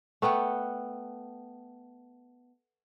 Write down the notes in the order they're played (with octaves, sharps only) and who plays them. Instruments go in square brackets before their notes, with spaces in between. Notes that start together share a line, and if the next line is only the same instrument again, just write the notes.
[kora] A3 B3 F#5 G5